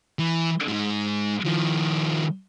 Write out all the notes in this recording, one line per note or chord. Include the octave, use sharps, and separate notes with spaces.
E3
G#2 G#3
D#3 F3